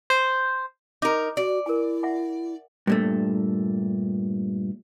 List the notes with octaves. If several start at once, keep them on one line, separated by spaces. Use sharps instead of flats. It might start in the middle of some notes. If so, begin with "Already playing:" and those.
C5
D#4 A#4 D6
F#4 D5
E4 A#4 G#5
E5 F#5 G#5
G2 A#2 A3